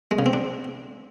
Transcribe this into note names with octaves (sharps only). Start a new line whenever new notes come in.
G#3
C#3
C4
D4